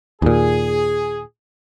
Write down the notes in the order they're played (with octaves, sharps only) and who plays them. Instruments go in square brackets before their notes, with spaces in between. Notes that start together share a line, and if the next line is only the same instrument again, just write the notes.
[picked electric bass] D#2 A#2 [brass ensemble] G#4